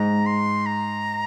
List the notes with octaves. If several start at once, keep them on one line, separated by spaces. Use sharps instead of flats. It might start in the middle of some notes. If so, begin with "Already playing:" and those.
Already playing: G#2 A#5
C6
A#5